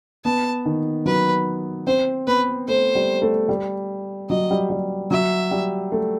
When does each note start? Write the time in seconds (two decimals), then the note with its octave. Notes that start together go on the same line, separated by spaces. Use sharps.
0.25 B3 A5
0.66 D#3
1.06 F#3 B4
1.87 C4 C5
2.27 B3 B4
2.68 A3 C5
2.95 G3
3.22 A3
3.49 G3
4.30 F#3 D#5
4.51 G3
4.70 G3
5.11 F#3 E5
5.51 G3
5.92 A3